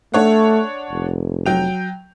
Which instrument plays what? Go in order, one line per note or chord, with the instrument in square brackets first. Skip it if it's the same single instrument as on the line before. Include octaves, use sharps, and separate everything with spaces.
[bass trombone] A3 [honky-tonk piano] D4 C#5 F#5
[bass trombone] F1
[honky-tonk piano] F#3 G5 F7